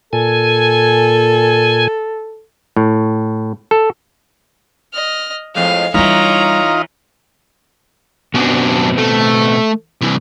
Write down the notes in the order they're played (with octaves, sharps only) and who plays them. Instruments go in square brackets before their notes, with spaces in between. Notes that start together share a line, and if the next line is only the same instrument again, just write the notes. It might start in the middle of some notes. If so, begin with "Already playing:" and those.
[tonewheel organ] A#2 G#5 [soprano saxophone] A4
[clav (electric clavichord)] A2
A4
[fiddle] D#5 F6
[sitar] F2 A2 G#3 [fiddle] F5
[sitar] E3 [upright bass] G3 D4 [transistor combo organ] D#4 F4 [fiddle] C#5 A#5
[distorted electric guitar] F#2 D4 [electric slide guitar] B2 B3 C4
[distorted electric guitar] A3
C2 E3